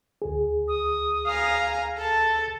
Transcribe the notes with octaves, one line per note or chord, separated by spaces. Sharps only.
D2 G#4
D#6
F5 G#5 A#5
A4 A5